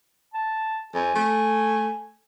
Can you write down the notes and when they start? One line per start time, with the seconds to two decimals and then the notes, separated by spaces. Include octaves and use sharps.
0.34 A5
0.94 F2 G#5
1.16 A3